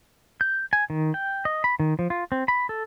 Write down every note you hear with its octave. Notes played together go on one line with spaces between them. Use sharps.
G6
G#5
D#3
G5
D#5
B5
D#3
F3
F4
C4
B5
A4